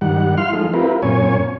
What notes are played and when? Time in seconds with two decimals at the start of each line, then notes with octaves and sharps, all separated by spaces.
0.01 G2 D#3 G3 F#5
0.37 E4 F5 C6 F6
0.53 F3 G#3 A3 D#4
0.73 C4 E4 F4 G4 A#4 B4
1.02 F#2 A#2 C4 C#4 C#5 G#5